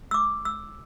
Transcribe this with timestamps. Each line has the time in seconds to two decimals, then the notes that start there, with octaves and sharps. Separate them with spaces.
0.11 E6
0.14 D6
0.45 E6